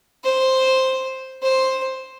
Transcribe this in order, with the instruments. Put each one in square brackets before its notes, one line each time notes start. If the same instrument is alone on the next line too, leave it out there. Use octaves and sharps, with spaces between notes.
[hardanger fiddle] C5
C5